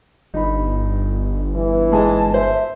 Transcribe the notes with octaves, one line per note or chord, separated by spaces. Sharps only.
G1 D#4 B5
E3
G#2 G#4 D#5 A5
C5 E5